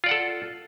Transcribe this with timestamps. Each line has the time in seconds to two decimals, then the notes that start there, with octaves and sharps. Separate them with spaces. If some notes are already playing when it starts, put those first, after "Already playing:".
0.04 F4
0.06 D5
0.09 F#5
0.11 A4